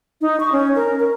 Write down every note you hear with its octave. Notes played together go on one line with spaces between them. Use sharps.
D#4
C#6
C#4
A#4
A#4